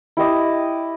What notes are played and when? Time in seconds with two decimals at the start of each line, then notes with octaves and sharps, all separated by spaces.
0.17 E4 G4 D#5 D6